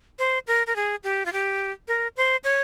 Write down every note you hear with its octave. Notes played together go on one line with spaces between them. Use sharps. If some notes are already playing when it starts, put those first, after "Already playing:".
C5
A#4
A#4
G#4
G4
F4
G4
A#4
C5
C#5